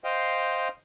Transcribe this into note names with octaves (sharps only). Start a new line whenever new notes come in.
C5 D#5 F5 G5